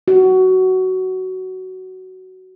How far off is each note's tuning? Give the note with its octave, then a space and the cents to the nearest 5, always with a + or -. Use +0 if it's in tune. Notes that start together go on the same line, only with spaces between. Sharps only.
F#4 +15